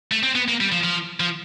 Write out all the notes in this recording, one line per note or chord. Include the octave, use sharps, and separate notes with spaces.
A3
C4
B3
A#3
G3
F3
F3
F3